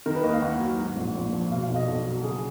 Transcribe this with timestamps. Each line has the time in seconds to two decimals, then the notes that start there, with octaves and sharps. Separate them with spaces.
0.06 D#3 A#4
0.15 B4
0.24 D#2 D#5
0.33 F5
0.42 D#2 F#5
0.60 F#3
0.79 G#2
0.96 A#1
1.14 A#1
1.33 F3
1.52 B2 F5
1.63 F5
1.70 B1
1.76 D#5
1.88 B1
2.06 F#3
2.24 C#3 G#4